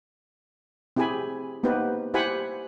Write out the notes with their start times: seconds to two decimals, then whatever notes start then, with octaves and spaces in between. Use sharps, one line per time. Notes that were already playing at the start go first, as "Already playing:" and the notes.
0.96 C4 E4 G4 G#4 G#5 B5
1.63 A#3 B3 D#4 G4 B4 C5
2.14 E4 G4 C5 F#5 G#5 B5